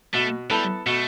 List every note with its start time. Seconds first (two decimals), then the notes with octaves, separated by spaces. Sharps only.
0.14 B2 A3
0.50 G3 B3 E4 A4
0.86 B2 A3